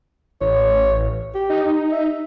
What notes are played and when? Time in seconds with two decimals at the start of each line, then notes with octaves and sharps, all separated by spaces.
0.41 A1 C#5
1.34 G4
1.50 D#4
1.92 E5